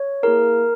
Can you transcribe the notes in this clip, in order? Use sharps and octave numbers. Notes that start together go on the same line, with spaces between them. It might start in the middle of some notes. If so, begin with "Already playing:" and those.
Already playing: C#5
A#3 E4 G#4 A#4